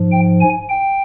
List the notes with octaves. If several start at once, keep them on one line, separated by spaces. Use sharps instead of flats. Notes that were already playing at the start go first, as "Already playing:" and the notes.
Already playing: G#2 F3
G5
G#5
G5